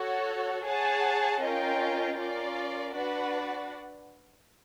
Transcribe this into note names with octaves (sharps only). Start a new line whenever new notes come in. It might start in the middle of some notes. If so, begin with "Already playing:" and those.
Already playing: F#4 A4 C#5 F#5
G#4 C#5 F#5 A5
C#4 F4 A#4 D#5 G5
C#4 F4 A#4 D5
D4 F#4 B4 D5 F#5